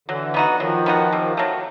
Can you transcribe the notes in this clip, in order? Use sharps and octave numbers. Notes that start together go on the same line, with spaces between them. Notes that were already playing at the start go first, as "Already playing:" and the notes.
D3 E3 F#3
B3 D#4 F#4
D#3 F3 F#3
B3 D#4 F#4
C3
D#3 F#3 A3